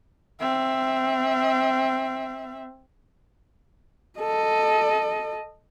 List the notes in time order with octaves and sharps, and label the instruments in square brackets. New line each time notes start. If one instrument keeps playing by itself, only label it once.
[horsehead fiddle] C4 E5
A4 D#5